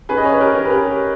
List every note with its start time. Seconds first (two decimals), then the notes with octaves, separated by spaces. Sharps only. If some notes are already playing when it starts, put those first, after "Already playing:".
0.09 C#4 G#4 B4
0.17 D#5
0.25 C#5
0.32 B4
0.40 G4 A#4
0.55 C#4
0.65 B4
0.70 G4 A#4